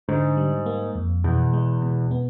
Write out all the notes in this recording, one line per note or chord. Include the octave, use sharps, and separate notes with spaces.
G#2 D3
G3
A#3
F2
E2 B2
G#3
B2
B3